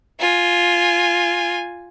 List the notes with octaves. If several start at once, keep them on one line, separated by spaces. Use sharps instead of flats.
F4 G#5